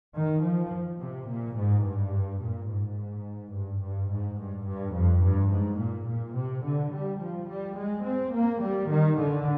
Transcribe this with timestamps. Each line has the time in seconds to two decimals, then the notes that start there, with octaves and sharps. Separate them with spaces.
0.15 D#3
0.43 F3
1.00 C3
1.28 A#2
1.56 G#2
1.84 G2
2.41 A#2
2.68 G#2
3.53 G2
3.81 G2
4.09 G#2
4.38 G2
4.66 G2
4.94 F2
5.22 G2
5.50 G#2
5.79 A#2
6.06 A#2
6.35 C3
6.63 D3
6.92 G3
7.20 F3
7.48 G3
7.76 G#3
8.04 C4
8.33 A#3
8.61 G3
8.88 D#3
9.17 D3